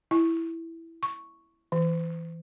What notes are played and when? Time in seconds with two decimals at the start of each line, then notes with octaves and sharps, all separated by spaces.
0.11 E4
1.03 C#6
1.72 E3